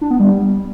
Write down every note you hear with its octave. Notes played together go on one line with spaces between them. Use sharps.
D4
B3
G3